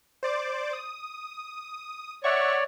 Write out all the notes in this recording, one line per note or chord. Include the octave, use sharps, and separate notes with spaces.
C5 D5 D6
D#6
C#5 D5 E5 F#5 C#6